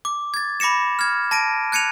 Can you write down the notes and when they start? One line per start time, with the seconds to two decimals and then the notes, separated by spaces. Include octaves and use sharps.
0.05 D6
0.34 G#6 A6
0.60 B5 D6 A#6 C#7 E7
0.99 F6 G#6
1.31 A5 A#6 D7 D#7
1.72 F#6 G#6 C#7 D#7 F7